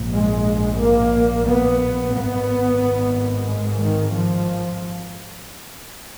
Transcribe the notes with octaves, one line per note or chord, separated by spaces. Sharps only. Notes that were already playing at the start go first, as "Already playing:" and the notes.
Already playing: A#1 G#2
G#3
A#3
B3
G#1 G#2 B3
G#3
D#3
F3